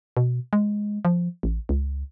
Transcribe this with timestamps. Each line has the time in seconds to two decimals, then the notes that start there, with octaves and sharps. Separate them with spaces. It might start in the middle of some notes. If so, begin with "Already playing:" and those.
0.17 B2
0.53 G#3
1.05 F3
1.43 A1
1.69 C#2